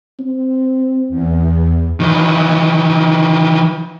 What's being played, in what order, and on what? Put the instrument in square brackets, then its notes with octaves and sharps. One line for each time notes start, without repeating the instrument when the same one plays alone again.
[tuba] C4
[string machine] E2
[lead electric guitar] D#3 E3